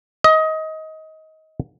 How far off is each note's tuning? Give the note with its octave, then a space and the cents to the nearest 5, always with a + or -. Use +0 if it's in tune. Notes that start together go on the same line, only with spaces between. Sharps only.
D#5 +20